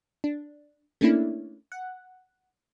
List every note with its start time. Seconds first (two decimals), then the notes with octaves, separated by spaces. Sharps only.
0.24 D4
1.01 A3 A#3 C#4 D4 E4
1.72 F#5